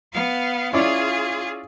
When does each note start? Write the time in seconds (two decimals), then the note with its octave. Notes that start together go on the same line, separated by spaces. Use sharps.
0.13 B3 F5
0.73 C#4 E4 F4 G#4 D5